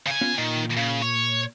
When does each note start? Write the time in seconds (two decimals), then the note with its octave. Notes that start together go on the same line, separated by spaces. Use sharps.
0.07 C#3 G#5
0.21 B3 C#4 F4
0.38 A#2 D#3
0.77 C#3
1.02 C#5